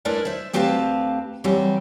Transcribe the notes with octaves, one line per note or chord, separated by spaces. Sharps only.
G#3 D4 E4 A#4 B4 D5
C5 E5
D2 C4 G4 B4 F5 A5
E3 F#3 G3 C4 G4